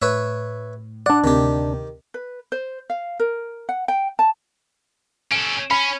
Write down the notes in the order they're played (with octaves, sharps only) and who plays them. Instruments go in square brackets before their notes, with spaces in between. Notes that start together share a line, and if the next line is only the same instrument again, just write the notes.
[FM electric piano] A2 [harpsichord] B4 C#5 E5
[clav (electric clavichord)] D4 D5 [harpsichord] F#5
[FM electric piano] D2 C3 [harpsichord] D#3 G4
[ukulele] B4
C5
F5
A#4
F#5
G5
A5
[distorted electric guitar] C#4 A4 [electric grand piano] D7
[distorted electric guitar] C#4 [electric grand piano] B5